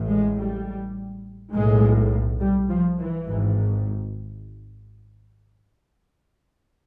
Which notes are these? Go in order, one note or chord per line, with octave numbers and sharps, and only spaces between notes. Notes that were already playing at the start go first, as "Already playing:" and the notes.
Already playing: A1 A2
G#3
G3
B1 A2 G#3
G3
F3
E3
G#1 G#2